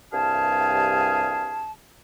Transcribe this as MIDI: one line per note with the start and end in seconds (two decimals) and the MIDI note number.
0.12 1.70 36
0.12 1.70 43
0.12 1.70 68
0.12 1.70 77
0.12 1.70 81